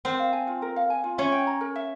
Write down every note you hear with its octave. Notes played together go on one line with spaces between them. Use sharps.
C4 A#4 C5
F5
G#5
F4
A#4
F5
G#5
F4
C#4 C#5 E5
G5
A#5
A#4
E5